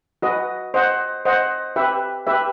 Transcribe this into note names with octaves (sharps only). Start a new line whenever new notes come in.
F#4 B4 D#5
C5 D#5 F#5
C5 D#5 F#5
G4 B4 E5
G4 B4 E5